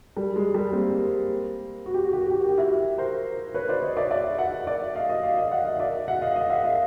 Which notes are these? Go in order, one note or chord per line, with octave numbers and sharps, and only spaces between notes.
G3
G#3
G3
A#3 C4
F#4
G4
F#4
G4
F#4
G4
F#4
G4
E4 F#4
A#4 C5
B4 C#5
C5 D5
C#5 D#5
D5 E5
D5 E5
E5 F#5
D5 E5
D#5 F5
D#5 F5
D#5 F5
D#5 F5
E5 F#5
D#5 F5
D5 E5
E5 F#5
D#5 F5
D#5 F5
E5 F#5
D#5 F5